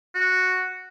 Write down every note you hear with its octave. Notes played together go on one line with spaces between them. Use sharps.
F#4